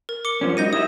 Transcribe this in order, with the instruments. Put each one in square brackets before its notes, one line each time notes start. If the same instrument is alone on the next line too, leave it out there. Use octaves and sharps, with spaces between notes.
[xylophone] A#4
D6 C#7 G7
[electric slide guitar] F#2 F3 C#4
[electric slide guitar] G#3 D#4 F#4 [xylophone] G6 A#6 D#7
[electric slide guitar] E4 G4 E5 [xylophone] D#6